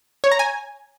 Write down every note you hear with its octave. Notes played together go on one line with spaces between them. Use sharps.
C#5
A#5
G#5